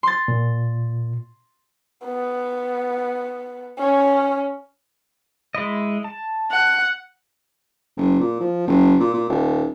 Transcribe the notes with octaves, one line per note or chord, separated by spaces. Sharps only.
C6 A6
A#2
B3
C#4
G#3 E4 D#5
A5
F#5
F#1
A#2
F3
F#1
A#2
A#2
D#1